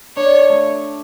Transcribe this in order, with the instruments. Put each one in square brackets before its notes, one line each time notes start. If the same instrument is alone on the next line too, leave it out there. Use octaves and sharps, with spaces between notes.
[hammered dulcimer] D4 [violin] C#5
[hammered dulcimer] A3